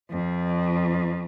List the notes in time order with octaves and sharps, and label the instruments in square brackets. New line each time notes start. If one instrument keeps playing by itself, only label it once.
[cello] F2